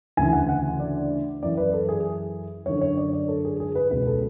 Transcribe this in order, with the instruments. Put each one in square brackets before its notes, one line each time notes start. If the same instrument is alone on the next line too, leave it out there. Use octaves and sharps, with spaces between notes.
[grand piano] D2 C#3 E3 G#5
F#5
F#5
D5
F#2 E3 D5
B4
A4
G#4
F#2 D3 C#5
C#5
D5
C#5
A4
G#4
G#4
B4
C#2 B2 B4
A4